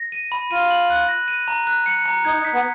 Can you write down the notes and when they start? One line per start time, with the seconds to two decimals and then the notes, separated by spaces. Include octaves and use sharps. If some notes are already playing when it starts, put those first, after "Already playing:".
Already playing: A#6
0.12 D#7
0.32 B5
0.51 F4 D#7
0.70 F#7
0.90 F#6
1.09 A#6
1.28 D#7
1.48 A#5
1.67 F#6
1.86 C#7
2.06 A#5
2.25 D#4 G#6
2.39 D#4
2.45 B6
2.53 B3